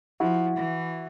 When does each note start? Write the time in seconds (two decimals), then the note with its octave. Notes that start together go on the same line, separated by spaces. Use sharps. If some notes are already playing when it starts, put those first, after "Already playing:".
0.20 F3 E4 F#4
0.58 E3